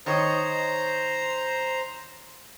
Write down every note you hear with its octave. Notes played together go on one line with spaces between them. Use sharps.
D#3 C5 C#5 D#5 A#5